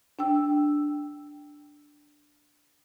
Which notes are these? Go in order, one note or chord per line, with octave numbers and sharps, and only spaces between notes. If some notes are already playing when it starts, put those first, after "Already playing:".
D4 G5 E6